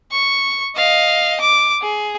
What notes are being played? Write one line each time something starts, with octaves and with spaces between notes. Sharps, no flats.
C#6
D#5 F5
D6
G#4